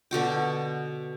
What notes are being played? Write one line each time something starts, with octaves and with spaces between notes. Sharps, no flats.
B2 D3 F#4 G5